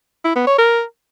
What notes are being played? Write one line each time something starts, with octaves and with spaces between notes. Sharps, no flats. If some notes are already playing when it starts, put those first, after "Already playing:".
E4
B3
C#5
A#4